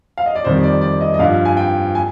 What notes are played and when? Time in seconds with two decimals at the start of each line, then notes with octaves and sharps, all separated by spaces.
0.18 F5
0.26 D#5
0.35 D5
0.44 F2 C3 D#3 G3 C5
0.63 D5
0.81 D5
1.01 D#5
1.14 D#5
1.19 G2 F3 F5
1.45 G#5
1.57 G5
1.95 G#5